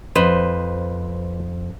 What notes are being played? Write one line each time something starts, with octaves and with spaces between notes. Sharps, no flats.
F2 B4 C5 D#5